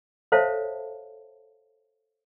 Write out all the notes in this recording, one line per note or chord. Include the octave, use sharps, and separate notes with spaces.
A4 C5 C#5 E5 F5 A5